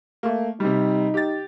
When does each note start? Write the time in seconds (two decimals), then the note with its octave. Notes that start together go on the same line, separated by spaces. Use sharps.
0.23 A3 A#3
0.60 C3 G3 D#4
1.14 G4 A6